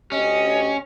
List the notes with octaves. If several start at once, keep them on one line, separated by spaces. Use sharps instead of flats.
D2 C#4 G4 D#5